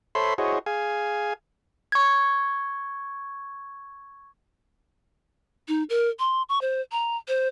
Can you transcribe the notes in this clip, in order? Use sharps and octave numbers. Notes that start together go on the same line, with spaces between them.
A4 C5 C#5 E5 B5 C6
E4 F#4 G#4 C5 C#5 D#5
G#4 F5 G#5
C#6 G#6
D#4
A#4
C6
C#6
C5
A#5
C5